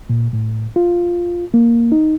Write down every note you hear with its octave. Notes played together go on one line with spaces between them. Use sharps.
A#2
A2
F4
A#3
D#4